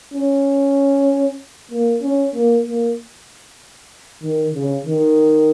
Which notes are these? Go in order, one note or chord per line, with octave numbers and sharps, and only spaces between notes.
C#4
A#3
C#4
A#3
A#3
D#3
C#3
D#3